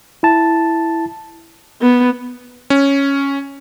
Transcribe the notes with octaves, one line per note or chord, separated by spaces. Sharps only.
E4 A5
B3
C#4